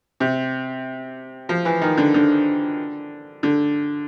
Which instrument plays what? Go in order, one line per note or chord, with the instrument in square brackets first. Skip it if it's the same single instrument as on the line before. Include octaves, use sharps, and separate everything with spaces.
[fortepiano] C3
F3
E3
D#3
D3
D3
D3